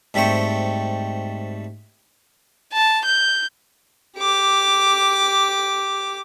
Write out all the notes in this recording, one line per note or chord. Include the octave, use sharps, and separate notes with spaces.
G#2 G3 A3 C4 G5 C#6
A5
G6
G4 D6